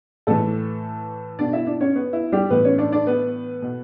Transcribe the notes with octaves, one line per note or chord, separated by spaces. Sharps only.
A2 E3 A3 A4
B2 D4 D5
E4 E5
D4 D5
C#4 C#5
B3 B4
E4
G3 G4
A2 E3 B3 B4
C#4 C#5
D4 D5
D4 D5
B3 B4
B2